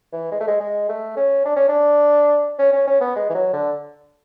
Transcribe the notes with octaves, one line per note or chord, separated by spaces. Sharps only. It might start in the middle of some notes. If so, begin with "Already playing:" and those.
E3
G#3
A3
G#3
G#3
A3
C#4
D4
C#4
D4
C#4
C#4
C#4
B3
G#3
E3
F#3
D3